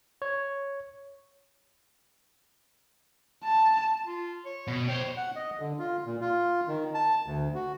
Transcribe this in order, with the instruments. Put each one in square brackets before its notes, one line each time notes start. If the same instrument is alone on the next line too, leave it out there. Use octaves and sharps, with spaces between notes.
[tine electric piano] C#5
[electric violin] A5
[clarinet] F4
C#5
[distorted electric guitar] B2
[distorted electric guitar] C5 C#5 [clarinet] G5
[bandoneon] F#5
D#5
D3
F4
A#2
F4
D#3
A5
D2
F#4